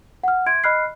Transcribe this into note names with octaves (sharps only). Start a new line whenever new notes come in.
F#5 F6
E5 C6 G#6 D7
D#5 B5 F6 F#6 C7